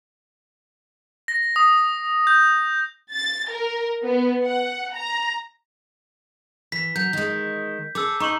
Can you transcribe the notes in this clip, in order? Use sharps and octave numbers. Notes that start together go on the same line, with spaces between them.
A#6
D#6
G6
A6
A#4
B3
F#5
A#5
E3 B6
F#3 G6
D#3 G#3
G#4 A4 D6 E6
D#4 A#5 C#6 F#7